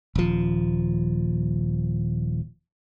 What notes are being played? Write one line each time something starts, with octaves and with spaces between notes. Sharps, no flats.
D#1 F3